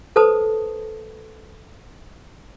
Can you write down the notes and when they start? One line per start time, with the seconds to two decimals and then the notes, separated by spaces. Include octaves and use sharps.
0.16 A4 B4 C5 A5 D#6